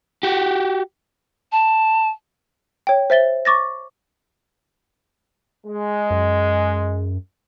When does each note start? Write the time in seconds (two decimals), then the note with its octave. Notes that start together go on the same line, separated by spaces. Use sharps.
0.23 F#4 G4
1.52 A5
2.87 C#5 G5
3.10 C5 E5 A6 G7
3.45 C#6 D6 A6 A#6
5.66 G#3
6.10 F#2